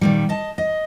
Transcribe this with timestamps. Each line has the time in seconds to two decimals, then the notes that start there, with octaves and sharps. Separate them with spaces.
0.01 A#2 D#3 G3
0.29 D#5 A5
0.58 D#5